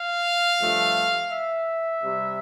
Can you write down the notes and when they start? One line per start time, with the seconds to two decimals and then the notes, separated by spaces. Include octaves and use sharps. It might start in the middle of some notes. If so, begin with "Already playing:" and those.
Already playing: F5
0.60 G2 F3 A3
1.31 E5
2.01 C3 G3